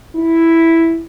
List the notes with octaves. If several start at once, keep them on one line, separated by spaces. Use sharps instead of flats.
E4